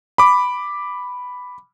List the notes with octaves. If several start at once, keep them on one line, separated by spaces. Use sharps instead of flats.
B5 D6